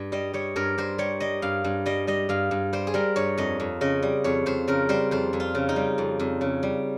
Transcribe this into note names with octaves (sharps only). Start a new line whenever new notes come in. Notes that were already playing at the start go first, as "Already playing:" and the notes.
Already playing: G2
G3 D#5
G3 C#5
G2 A#4
G2 C5
G3 C#5
G3 D#5
G2 F5
G2
G3 D#5
G3 D#5
G2 F5
G2
G3 C5
G#4
G3 A#4
G2 C#5
F2 D#5
F2
C#3 D#5
G3
F2 C#5
F2 C5
C#3 A#4
G3 C5
F2 C5
F2
F4
C#3
D#4
G3
F2
F2
C#3
G3